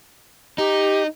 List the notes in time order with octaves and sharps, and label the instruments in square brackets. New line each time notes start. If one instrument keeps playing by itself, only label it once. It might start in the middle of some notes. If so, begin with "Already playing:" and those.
[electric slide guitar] D#4 [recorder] G4